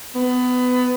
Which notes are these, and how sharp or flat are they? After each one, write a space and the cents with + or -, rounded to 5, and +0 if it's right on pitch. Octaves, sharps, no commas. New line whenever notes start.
B3 +20